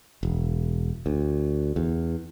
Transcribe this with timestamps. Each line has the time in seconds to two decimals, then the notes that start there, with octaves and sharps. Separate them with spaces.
0.23 E1
1.06 D2
1.76 E2